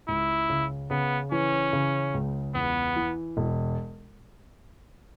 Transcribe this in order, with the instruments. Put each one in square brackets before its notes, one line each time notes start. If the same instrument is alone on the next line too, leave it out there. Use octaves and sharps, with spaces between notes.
[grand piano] C#2 [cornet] E4
[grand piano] C#3
[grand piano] C#3 [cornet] B3
[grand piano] E3 [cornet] C#4
[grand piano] C#3
C#2
[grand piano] E2 [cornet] B3
[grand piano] E3
E1